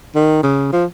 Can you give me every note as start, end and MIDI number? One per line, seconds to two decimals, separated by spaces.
0.15 0.42 51
0.43 0.69 49
0.73 0.85 53